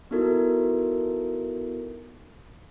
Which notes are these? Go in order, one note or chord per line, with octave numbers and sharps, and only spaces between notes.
B3 D#4 E4 F#4 A4 A#4